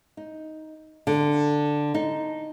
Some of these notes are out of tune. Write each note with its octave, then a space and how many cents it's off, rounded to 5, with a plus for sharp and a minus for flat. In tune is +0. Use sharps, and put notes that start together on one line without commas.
D#4 +10
D3 +5
D#4 -5